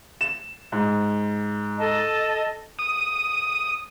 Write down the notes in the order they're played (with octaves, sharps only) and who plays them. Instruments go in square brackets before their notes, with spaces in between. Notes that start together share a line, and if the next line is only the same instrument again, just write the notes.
[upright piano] E7
G#2
[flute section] A4 D#5 A5
[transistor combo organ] D#6